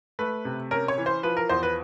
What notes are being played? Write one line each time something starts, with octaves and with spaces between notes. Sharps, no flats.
A3 B4
C3
C#4 A#4
C#5
E3
C5
F3 B4
A#4
E2 C5
B4